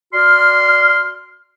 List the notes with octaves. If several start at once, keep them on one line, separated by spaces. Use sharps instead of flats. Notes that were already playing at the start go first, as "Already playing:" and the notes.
F#4 D5 C6 F6